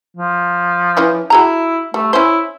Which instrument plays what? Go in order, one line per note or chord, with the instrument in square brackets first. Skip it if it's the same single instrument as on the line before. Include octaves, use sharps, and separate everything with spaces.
[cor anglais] F3
[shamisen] E3 C#4 E4
[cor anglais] E4 [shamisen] F#4 G#4 A#5
[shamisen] G3 [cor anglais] A3
[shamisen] C#4 C5 [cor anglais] E4